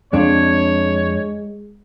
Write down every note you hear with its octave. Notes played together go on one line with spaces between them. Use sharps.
F2 G#3 D4 C#5